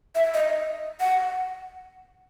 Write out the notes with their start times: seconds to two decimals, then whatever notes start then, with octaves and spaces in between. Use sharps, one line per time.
0.15 E5
0.34 D#5
1.00 F#5